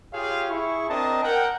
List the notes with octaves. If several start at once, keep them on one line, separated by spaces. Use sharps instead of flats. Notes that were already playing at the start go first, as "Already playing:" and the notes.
F4 G4 G#4 C#5 F5
E4 G#4 C#6
C4 D4 A#4 D5 D#5 A5
A#4 F#5 G5